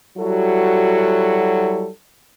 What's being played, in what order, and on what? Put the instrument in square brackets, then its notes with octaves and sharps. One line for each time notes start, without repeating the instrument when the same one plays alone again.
[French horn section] F#3 G3 E4 F#4 A4